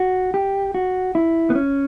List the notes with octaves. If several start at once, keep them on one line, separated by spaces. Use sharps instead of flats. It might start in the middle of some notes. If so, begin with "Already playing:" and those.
Already playing: F#4
G4
F#4
E4
B3
C#4